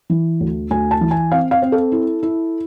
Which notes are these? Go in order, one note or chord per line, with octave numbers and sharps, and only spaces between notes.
E3
D2
D2 G#5
A5
E3
G#5
C4 F5
F5
C4
A4
E4
E4